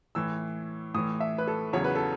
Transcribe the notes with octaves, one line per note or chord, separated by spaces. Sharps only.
A2 E3 E6
A2 E3 D#6
E5
B4
A4
E2 C#3 F#3 C#5
B4
A4